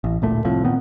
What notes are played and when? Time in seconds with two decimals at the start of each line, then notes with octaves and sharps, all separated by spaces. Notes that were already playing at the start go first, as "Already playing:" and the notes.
0.04 A1
0.22 D1 A#2 A3
0.44 C2 F2 A2 F3
0.64 A#2 D#3 B3 C4